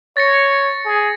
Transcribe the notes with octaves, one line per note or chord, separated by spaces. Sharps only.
C#5 A6 A#6 C#7
G#4